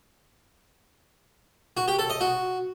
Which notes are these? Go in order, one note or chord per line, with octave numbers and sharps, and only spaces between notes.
F#4
G4
A4
D#5
F#4